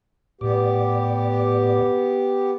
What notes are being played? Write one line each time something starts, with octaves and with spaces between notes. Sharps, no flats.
A2 B3 G4 D5 D6